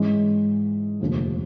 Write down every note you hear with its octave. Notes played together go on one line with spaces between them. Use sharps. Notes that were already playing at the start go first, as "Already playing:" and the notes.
Already playing: G#2 E3 G#3 C#4
F1 D#2 D3 F3